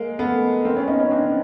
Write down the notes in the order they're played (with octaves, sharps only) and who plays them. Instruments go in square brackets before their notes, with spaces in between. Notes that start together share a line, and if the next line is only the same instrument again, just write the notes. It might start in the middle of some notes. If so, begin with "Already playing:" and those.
Already playing: [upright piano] G#3 A#3
A3 B3
A#3 C4
B3 C#4
C#4 D#4
C#4 D#4
C4 D4